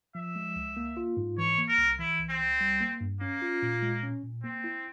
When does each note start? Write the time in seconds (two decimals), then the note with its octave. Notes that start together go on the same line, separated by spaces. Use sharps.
0.15 F3 E5
0.36 G#3
0.56 C#2
0.77 A#3
0.97 F4
1.17 G#2
1.38 E3 C#5
1.58 A#3
1.68 A#4
1.78 C2
1.99 E3 E4
2.19 C2
2.29 C4
2.40 C2
2.61 G3
2.81 A#3
3.01 G2
3.21 A#3 C#4
3.42 F4
3.62 A#2
3.82 G#3
4.03 C#4
4.23 A#2
4.43 A#3 C4
4.64 E4